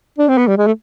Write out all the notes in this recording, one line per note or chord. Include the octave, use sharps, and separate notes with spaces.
D4
C4
B3
G3
G#3
A3